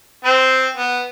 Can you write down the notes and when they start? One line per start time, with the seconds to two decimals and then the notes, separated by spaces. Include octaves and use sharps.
0.25 C4 C5
0.77 B3